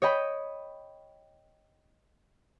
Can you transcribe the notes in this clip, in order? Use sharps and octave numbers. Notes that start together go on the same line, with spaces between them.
C#5 D#5 G5 B5